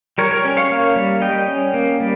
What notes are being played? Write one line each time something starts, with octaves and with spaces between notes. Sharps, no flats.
G3 A#4 C#5
A#4 C#5
C#4
C#5 F5
A#3
G3
G3 D#5 G5
C#4
A#3
G3